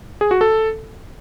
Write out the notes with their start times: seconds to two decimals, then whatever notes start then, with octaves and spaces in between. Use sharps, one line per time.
0.21 G#4
0.31 F#4
0.41 A4